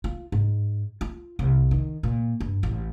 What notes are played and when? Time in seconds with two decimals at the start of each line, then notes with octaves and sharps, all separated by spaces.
0.04 F4
0.32 G#2
1.01 F4
1.39 C2
1.71 D#3
2.03 A#2
2.40 G2
2.63 A1